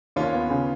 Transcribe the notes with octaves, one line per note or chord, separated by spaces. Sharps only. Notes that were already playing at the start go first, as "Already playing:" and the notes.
D#2 C#4 F4
B3
C#3